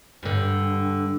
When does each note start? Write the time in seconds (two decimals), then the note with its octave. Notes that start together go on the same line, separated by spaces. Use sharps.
0.23 G2 D3